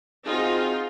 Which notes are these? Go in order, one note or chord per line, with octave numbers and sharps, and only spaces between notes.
C4 D#4 F4 F#4 G#4